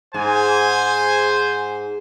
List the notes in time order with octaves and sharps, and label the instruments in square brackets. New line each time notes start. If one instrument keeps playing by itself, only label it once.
[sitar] G#2 [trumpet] C5 [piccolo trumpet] G#5